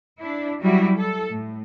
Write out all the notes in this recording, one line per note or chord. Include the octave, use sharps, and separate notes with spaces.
D4 E4
F#3 G3 E4 F#4
A4
A2